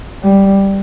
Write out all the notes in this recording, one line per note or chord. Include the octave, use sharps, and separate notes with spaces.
G3